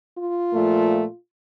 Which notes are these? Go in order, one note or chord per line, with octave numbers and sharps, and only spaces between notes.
F4
A#2 F3 A3